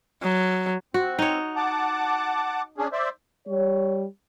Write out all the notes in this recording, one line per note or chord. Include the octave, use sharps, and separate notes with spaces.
F#3
C4 F#4
D#4 C#5
F#5 A5 D6
C#4 D4 G#4
C5 D5 E5
G3 C#5